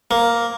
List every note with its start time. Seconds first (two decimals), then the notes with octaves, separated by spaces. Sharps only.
0.11 A#3